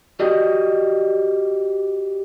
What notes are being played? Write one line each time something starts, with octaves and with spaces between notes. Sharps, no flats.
F#4 G4 D5 D#5